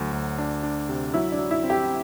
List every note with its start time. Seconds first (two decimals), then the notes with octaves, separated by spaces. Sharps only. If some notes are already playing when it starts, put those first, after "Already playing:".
Already playing: D2 F#3
0.13 D2
0.38 D4
0.63 D4
0.89 C3
1.14 F#3 E4
1.32 D4
1.39 F#3
1.51 E4
1.64 C4
1.70 G4